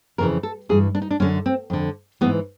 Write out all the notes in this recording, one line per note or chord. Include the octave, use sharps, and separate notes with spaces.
F2 C#3 E3 A#4
A4
G2 E3 G#4
D4
D#4
D4
F#2 D3 C#4
C4
F2 D3
G#2 E3 B3